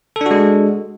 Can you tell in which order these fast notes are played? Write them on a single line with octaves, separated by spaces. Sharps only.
A4 D4 F#4 G#3